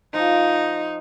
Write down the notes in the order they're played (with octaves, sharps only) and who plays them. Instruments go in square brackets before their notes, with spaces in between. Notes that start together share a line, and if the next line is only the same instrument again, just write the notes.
[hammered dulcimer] F3 [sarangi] D#4